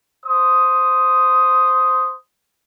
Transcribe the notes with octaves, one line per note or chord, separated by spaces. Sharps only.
C5 D#6